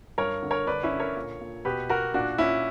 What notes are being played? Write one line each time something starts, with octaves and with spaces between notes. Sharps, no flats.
G2 A#4 C#5
D3
A#4 C#5
D3 B4 D5
C#4 E4
D3
A#4 C#5
A#2
A#2
B2 G4 B4
B2 F#4 A#4
A#2 D4 F#4
A#2 C#4 E4